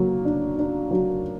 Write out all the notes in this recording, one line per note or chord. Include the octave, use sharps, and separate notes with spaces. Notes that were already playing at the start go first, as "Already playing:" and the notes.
Already playing: F#3 A#3
D4
D4
F#3